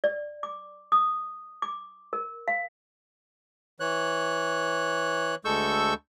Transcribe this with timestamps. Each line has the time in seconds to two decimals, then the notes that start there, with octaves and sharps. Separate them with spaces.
0.04 D5
0.43 D6
0.92 D#6
1.62 D6
2.13 A#4
2.48 F5
3.80 E3 C#5 F#6
5.45 D2 G#3 A4 C#6 E6 G6